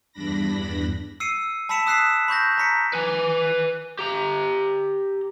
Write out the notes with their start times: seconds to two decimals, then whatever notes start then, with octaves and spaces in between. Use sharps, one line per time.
0.13 E2 G2 D4 B5 A#6
1.20 E6 C7 C#7 D#7
1.69 A5 B5 E6 B6 C#7 E7
1.86 D#6 E6 F#6 B6 C7 E7
2.28 B5 C#6 G6 A#6
2.58 A#5 B6 C#7
2.93 B4 G#5
3.99 G4 A#5